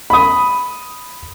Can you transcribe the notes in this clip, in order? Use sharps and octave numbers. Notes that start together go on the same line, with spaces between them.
B5 D#6